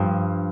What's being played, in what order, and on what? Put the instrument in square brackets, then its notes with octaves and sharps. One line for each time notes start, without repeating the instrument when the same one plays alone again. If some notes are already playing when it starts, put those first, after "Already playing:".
Already playing: [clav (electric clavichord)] G2 F3